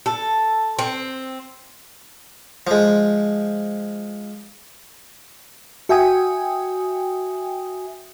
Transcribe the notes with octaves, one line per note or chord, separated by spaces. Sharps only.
A4
C4
F3 G#3
F#4 E5 G5 G#5 D#6